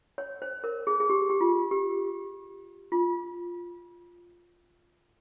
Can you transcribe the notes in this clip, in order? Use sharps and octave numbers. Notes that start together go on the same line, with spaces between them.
C#5
C5
A#4
G#4
G#4
G4
G4
F4
G4
F4